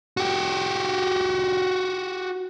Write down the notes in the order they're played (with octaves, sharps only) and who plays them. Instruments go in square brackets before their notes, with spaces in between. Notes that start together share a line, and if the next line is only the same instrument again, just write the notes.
[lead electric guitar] F#4 G4